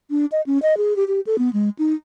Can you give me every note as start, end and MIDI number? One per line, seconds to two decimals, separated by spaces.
0.11 0.25 62
0.32 0.41 75
0.46 0.58 61
0.63 0.77 75
0.77 0.96 68
0.96 1.04 67
1.08 1.20 67
1.27 1.36 69
1.38 1.52 59
1.53 1.69 56
1.79 1.93 63